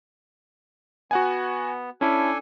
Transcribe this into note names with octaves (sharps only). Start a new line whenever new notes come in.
B3 F#4 F#5 G#5
C#4 D4 E4 A4 G#5